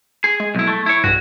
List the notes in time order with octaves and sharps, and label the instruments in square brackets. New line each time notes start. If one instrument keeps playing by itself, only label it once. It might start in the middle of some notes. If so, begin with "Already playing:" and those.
[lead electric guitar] G#4
[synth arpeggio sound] G#3
[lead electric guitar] B1 E4
A3
E4 C#5
[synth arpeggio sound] B1 G2 [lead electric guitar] F#4